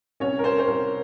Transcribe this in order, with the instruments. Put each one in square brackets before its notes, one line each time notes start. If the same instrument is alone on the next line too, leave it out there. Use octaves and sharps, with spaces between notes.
[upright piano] C2 C#4 C#5
A#4
C2 C5
C5
C2 A#4